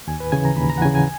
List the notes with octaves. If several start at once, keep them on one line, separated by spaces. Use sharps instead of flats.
D#2 G#5
B4
C#3 E3 G#5
A#5
D#2 B5
A#5
F#5
C#3 E3 G#5
G#5